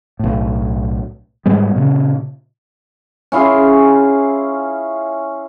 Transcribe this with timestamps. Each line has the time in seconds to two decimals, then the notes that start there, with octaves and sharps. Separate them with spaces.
0.19 B1 A2
1.46 G#2 G3 G#3 B3
1.76 A#2 C#3
3.32 C#4 E4 F4 G#4